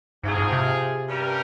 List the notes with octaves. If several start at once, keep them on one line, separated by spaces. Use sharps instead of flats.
G#2 F3 C4 F4 G#4
G#2
C3
G2 G3 C#4 G4 A#4